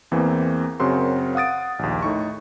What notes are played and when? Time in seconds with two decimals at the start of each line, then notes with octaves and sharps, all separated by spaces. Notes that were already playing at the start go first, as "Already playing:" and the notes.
0.12 E2 E3 A#3 C4
0.80 F#2 C#3 C4 F#4 A#4 C6
1.35 F5 F#5 D#6 A6 D7
1.79 A#1 D#2
2.02 A2 D#4 C#6